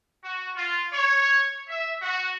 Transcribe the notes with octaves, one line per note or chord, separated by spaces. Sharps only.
F#4
F4
C#5
E5
F#4